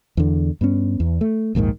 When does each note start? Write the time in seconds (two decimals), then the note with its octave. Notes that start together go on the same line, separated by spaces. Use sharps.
0.17 E2 D3
0.61 G2 B3 C#4
1.00 E2
1.21 A3
1.55 A#1 D#2 G#2 D#3